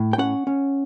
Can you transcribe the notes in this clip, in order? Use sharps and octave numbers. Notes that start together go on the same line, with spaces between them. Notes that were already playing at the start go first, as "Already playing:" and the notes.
Already playing: A2
G5
C#4 F#5
C#4